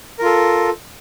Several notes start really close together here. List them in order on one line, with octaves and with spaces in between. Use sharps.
A#4 F4 A4